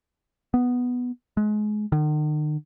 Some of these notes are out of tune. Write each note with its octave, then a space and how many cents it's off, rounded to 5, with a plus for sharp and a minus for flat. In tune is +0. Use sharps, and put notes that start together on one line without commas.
B3 +0
G#3 +30
D#3 -45